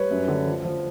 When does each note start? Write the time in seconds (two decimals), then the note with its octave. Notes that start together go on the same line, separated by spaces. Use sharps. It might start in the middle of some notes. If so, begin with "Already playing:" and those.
Already playing: G3 B4 C#5
0.11 F#2
0.28 D3
0.47 F3
0.65 F3